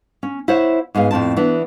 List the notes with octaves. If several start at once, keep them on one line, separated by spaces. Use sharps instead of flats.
C#4
E4 C5 C#5 F#5
G#2 G#3 B3 F5
F2 A2 C4 A5
E3 B3 D4